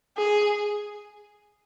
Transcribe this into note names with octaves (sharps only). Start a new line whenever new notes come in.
G#4